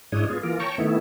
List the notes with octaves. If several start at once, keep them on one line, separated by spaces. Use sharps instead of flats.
G#2 G#3 D4 E4 C#5 D#6
B3 F4 G#4
E3 A#3 F4 A#4
C#5 G5 A5 A#5 C#6
D#3 A3 B3 E4